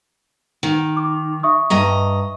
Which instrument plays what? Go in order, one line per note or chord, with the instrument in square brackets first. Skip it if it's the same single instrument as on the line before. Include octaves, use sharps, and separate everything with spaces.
[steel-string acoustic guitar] D#3
[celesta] D6
E5 C#6 D#6
[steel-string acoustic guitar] G2 D#5 A#5